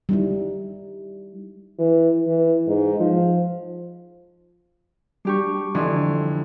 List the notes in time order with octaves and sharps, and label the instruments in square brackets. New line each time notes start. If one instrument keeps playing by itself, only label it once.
[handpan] G3 D#4 E4
[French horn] E3
E3
G#2
F3
[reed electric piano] G3 C#6 [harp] D4 G4
[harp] F2 E3 [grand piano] D3